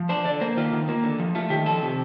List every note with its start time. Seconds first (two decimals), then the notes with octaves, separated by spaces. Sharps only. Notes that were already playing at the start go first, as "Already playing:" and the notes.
Already playing: F3
0.09 D4 C5
0.25 D3 D5
0.41 A#3 C5
0.57 D#3 F4
0.73 D#3
0.89 A#3
1.03 D3
1.20 F3
1.35 A3 F4
1.50 D#3 G4
1.66 F3 A4
1.82 C3